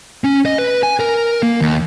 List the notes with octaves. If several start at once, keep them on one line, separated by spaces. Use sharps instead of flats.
C#4
D#5
B4
G#5
A#4
A#3
D#2